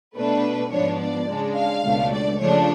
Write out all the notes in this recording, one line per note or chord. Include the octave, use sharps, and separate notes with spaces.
B2 A3 D4 B4
G#2 F3 B3 D4 C#5
D5
C#3 G#3 D4
F5
C#2 B2 A3 D4
D5
C#3 F3 A3 D4 C#5